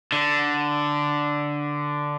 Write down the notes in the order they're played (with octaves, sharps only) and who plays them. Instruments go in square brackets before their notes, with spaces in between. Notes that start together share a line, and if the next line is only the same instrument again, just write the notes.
[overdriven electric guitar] D3